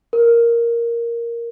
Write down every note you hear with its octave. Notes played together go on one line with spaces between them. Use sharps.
A#4